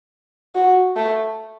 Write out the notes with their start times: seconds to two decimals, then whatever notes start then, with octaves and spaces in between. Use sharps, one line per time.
0.55 F#4
0.96 A3